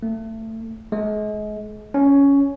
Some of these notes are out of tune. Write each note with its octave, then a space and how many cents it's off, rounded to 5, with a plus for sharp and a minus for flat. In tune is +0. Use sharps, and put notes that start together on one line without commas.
A3 +25
G#3 +35
C#4 +10